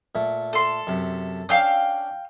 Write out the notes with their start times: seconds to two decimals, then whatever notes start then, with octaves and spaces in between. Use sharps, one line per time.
0.15 A#2 A3
0.53 A4 C6
0.87 F#2 C3
1.49 C#4 D4 F5 G5 E6